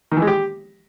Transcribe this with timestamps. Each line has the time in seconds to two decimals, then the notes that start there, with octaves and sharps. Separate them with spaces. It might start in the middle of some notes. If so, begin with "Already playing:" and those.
0.12 D#3
0.17 E3
0.22 G#3
0.27 G4